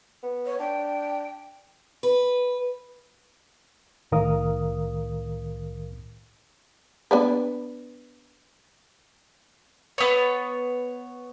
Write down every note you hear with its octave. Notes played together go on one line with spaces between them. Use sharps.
B3
C#5
D4 G5
B4
C2 A2 D#3 A#4 F5 D#6
B3 D4 B4
B3 C#5